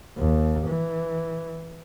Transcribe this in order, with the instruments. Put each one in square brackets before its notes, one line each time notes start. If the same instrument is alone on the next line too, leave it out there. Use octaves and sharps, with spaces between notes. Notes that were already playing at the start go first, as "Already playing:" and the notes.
[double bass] D#2
E3